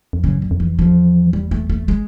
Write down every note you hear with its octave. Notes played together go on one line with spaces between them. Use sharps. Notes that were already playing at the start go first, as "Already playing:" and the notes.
F2
F#2 C#3
D3
F2
E3
E2 F3
G3
A3
A3
G#3